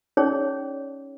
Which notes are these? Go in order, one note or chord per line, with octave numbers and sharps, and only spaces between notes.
C#4 D#4 G#4 C#5 D5